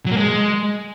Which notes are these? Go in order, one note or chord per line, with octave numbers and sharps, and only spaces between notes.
F#3
A#3
G#3